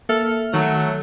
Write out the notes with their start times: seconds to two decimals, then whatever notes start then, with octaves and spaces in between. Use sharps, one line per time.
0.09 A#3 A4 E5 F6
0.54 D#3 F#3 A3